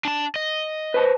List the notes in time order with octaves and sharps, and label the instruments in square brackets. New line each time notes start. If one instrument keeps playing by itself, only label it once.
[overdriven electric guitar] D4 A5
D#5
[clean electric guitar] B4 C5 A5